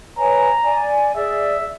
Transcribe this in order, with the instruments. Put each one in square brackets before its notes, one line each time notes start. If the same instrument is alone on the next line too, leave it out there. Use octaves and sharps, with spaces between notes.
[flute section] B4 C#5 G#5 [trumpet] A#5
[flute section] D5 G#5
[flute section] G#4 D5 [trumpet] E5